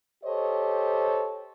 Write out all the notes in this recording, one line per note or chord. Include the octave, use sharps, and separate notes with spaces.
G4 A4 C5 C#5 D#5